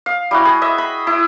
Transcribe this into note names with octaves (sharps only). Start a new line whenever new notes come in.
F5
G3 E4 F#4
G#4
D#5 E5
B5
E4